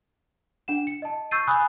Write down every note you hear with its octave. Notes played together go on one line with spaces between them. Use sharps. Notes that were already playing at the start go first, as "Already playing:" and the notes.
D4 F#5 E7
C#7
D#5 A5
C#6 E6 G6 A6 C7 D#7
G#5 B5 D#6 E6 F#6